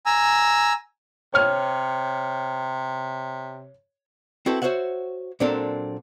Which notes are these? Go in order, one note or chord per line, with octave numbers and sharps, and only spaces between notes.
G#5 A#5 E6
C3 C#5 F6
C4 E4 F#4 A4 B4
F#4 C5 C#5 E5 F#5
A#2 F#3 C4 D4 A4 A#4